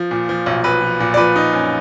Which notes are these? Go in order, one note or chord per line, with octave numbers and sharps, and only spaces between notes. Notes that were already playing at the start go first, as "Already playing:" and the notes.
Already playing: F3
A#2
F3
B1
B1 B4
F3
A#2
D5
F3 B4
D#4
F#2